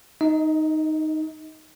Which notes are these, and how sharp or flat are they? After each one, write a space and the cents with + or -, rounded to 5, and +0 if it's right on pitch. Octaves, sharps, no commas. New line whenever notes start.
D#4 +0 D#5 +35